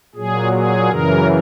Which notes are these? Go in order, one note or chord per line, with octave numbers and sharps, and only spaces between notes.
A#2 F#3 G#4
G#4
F#2 C#3 E3 A#4